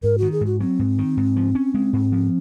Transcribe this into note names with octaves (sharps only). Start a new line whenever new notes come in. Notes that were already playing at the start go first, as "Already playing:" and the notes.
G#2 A#4
D#3 F#4
G#4
G#2
F#4
F#3 C4
G#2
D#3
G#2
F3
C#4
G#3
G#2
F3